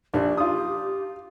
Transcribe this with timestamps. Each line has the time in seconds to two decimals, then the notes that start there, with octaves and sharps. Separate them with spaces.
0.14 A#1 D4 G4
0.37 F4 D#6